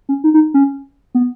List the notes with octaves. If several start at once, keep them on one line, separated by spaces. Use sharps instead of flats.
C#4
D#4
D#4
C#4
B3